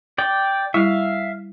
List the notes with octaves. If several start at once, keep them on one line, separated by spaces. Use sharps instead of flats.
D5 G5
G3 E4 E5 F5